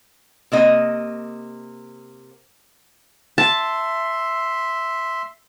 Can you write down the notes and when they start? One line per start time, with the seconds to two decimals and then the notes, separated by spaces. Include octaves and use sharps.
0.52 C3 A#3 D#5
3.38 E5 A5 C6